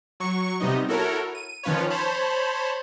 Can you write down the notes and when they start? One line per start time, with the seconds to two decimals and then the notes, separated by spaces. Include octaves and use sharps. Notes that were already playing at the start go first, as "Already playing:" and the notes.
0.20 F#3 C#6 C#7
0.60 C3 G3 B3 D#4 D#5
0.88 E4 F#4 A4 A#4 C#5
1.35 D#7
1.63 D#3 F3 C#4 F4 B4 C#5
1.90 C5 C#5 A5 B5